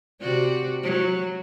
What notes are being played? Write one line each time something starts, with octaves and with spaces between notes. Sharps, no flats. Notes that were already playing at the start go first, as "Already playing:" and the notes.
C3 F#4 D5
F#3